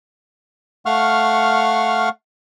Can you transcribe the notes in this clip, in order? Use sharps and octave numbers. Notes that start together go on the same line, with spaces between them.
A3 F5 F#5 C#6 F6